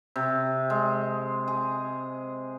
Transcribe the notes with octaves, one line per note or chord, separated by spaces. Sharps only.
C3
G#3
G#4